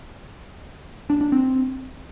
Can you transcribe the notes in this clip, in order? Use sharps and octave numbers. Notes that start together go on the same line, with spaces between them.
D4
D4
C4